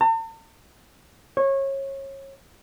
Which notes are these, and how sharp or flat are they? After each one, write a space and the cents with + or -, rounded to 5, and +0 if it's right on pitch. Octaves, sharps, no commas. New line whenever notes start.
A5 +45
C#5 -25